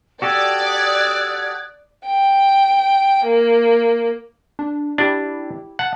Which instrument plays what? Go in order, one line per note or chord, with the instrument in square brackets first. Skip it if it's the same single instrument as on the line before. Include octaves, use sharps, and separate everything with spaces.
[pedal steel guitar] F#4 G4 A4 [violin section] D5 [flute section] D#6 F#6 G#6
[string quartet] G5
A#3
[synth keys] D4
[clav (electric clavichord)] D4 [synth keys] E4 G4
[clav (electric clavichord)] F#5 [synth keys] A5